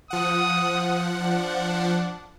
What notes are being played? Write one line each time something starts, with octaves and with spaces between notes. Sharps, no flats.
F3 F#5 D#6
D4